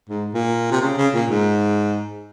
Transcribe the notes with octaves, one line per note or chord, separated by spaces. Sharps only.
G#2
A#2
C3
C#3
C#3
A#2
G#2